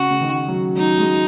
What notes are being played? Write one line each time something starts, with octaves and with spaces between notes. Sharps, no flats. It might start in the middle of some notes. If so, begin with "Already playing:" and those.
Already playing: C#3 F#4
C#3
D#3
F#3
F#3 D#4
G#3